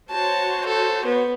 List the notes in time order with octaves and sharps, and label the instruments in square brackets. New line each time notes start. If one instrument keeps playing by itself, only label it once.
[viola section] F#4 C5 C#5 [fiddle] A5
[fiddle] A4
B3